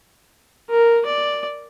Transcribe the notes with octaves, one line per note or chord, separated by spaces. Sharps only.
A#4
D5